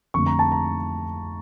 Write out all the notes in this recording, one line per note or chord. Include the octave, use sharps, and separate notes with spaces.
F2 D3 A3 C#6
A#5
A5
A#5